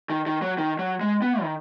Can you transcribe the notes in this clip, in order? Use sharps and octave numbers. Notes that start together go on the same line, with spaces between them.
D#3
D#3
F#3
D#3
F#3
G#3
B3
D#3